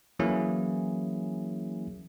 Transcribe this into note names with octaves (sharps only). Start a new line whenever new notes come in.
E3 F#3 A#3 C#4 E4 G#4